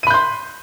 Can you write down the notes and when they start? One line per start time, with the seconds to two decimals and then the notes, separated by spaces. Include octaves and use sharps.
0.03 D#7
0.07 B5
0.10 G6
0.14 C6